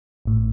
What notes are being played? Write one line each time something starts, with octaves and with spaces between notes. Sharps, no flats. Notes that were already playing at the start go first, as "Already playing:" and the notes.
A1 A2